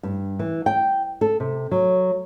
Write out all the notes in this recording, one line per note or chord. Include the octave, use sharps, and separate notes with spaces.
G2
E3
G5
A4
C3
F#3